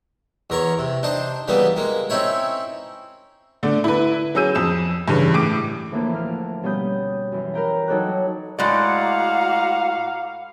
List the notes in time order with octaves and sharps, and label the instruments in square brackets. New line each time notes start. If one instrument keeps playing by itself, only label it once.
[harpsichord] E2 A#4 C#5
C3
D4 D#4 C5
C#3 E3 G3 A#3 B3
G#3 A#3
C4 C#4 D#4 E4 C#5
[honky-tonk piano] D3 A3 D5
E4 B4
F#3 C#4 G#4 E6 G6 D#7
F2 D#6 E7
G2 C#3 E3
A2 D6 D7
[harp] D2 A2 E3 F3 A#3 A4
F6
B2 G3 C#4 B5 D#6 G6
F#2 E3
A#4 B4 G5 A#5
F#3 D#4 A4 C#5 D6 F#6
[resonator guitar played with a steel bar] A2 G#3 D5 [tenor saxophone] F#4 [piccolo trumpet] F5 [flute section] F#5 A#5 D6